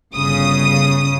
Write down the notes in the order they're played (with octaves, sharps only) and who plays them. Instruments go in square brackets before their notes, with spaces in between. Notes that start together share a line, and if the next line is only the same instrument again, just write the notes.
[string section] G1 C#3 D#6